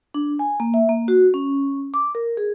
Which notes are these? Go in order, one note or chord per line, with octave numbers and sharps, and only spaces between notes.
D4
G#5
A#3
E5
A#3
F#4
C#4
D6
A#4
G#4